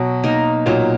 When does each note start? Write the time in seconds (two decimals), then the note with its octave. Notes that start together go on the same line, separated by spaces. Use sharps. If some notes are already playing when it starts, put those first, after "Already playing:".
Already playing: B2 F#3
0.24 A#3 D#4 A#4
0.66 A#2 F#3